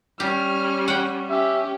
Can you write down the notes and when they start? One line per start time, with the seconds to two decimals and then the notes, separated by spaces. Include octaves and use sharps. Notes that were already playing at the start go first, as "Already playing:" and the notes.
0.20 G3 C#4 G4 F6
0.88 F#5 G5
1.30 C#4 G4 E5